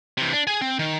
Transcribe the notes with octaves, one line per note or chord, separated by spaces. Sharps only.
C3 E3
D4
G#4 G#5
C4
D#3